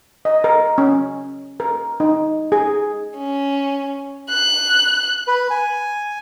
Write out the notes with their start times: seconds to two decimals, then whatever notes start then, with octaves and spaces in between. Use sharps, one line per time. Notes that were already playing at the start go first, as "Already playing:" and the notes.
0.25 D#5
0.44 A#4
0.78 C#4
1.60 A#4
2.00 D#4
2.52 G#4
3.18 C#4
4.29 F#6
5.27 B4
5.50 G#5